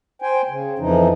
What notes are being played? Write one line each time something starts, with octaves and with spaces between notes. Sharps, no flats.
C5 G5 G#5
C#3
F2 E3 F3 D#4